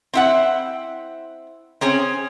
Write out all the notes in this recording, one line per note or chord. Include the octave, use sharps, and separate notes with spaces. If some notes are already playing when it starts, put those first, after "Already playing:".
C4 E4 F#5
C4 C#4 G#4